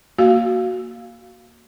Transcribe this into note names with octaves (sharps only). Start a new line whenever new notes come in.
A#3 F#4 F5